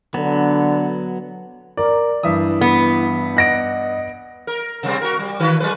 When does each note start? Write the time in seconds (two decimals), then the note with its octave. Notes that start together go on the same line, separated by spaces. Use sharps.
0.14 D3 F#3 B3
1.77 A#4 D5
2.23 G2 E3 E5 D#6
2.61 B3
3.37 D#5 F#5 A#6 D7
4.47 A#4
4.83 C3 G3 C4
5.01 F#4 A#4
5.19 G3
5.40 D#3 F#4 B4
5.60 F#3 G#3 B4